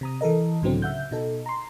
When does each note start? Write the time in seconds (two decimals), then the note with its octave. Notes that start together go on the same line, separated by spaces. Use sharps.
0.01 C3 A#5 D#6
0.21 E3 A4 A#4 D#5
0.62 C#2 A2 D3 F#3 B3 C4
0.82 C#3 E5 F#5 G6
1.11 B2 D#4 A4
1.46 A#5 C6